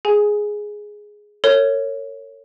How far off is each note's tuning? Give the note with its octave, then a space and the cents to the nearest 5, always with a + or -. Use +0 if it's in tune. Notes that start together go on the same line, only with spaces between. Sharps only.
G#4 +0 G#5 +0
A#4 -45 C#5 +0